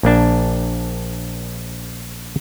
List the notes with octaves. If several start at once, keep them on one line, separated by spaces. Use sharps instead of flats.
A#1 A#3 D4 A5